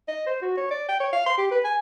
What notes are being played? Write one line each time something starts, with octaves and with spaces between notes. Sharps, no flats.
D#5
C5
F#4
C#5
D5
G5
C#5
F5
C6
G4
B4
G#5